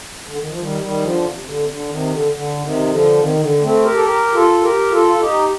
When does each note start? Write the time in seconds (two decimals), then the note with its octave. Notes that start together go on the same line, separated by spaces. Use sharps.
0.27 D3
0.38 D#3
0.49 F3
0.59 D#3 G3
0.80 D#3 G3
1.02 D3 F3
1.24 C3
1.37 C3
1.46 D3
1.57 C3
1.68 D3
1.89 C3 D#3
2.10 D3
2.32 D3
2.61 C3 D#3
2.89 D3 F3
3.18 C3 D#3
3.35 C3
3.40 D3
3.62 A3 C4
3.83 G4 A#4
3.95 A4
4.05 G4 A#4
4.34 F4 A4
4.62 G4 A#4
4.91 F4 A4
5.13 F4
5.20 D#4 G4